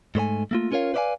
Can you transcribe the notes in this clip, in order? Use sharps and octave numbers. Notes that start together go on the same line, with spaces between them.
G#2 A3 C5 G#5
A3 A#3 F4
C#4 F4 A#4 C#5 F5
B4 C5 D5 E5 F5 G#5